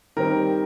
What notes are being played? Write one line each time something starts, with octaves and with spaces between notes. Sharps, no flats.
D#3 G3 C4 A#4